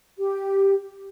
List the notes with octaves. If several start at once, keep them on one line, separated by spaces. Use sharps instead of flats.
G4